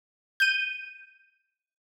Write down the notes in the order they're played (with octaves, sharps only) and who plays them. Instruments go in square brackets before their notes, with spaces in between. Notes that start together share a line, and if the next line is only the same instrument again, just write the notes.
[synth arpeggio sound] G6 D#7